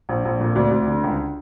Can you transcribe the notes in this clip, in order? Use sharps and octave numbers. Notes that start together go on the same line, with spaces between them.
A#1
A#1
A#2
D2 D5
D2
D3
C#2